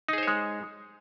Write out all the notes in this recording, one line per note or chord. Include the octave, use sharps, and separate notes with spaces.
G#3 D#4 G#4 C5 C#5